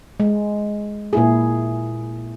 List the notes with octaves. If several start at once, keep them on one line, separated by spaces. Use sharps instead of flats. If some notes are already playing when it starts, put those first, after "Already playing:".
G#3
A#2 E4 G#4